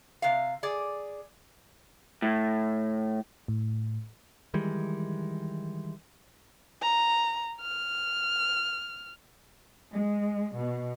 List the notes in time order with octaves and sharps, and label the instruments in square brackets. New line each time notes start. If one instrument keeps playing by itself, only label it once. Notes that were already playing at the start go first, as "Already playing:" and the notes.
[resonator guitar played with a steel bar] C3 F5
G#4 D5
[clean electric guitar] A2
[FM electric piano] A2
[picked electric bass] D#3 E3 G3 G#3
[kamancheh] A#5
F6
[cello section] G#3
B2